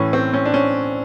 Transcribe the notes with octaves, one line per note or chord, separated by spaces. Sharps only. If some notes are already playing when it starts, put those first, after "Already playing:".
Already playing: A2 E3 C#4
C4
C#4
D4
C#4